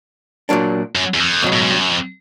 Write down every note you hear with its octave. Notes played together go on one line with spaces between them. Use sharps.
A#2 F#3 A#3 D4
F#2
E2
F2
C#2 B2 F#3
A2
G#2
G2
F#2
F2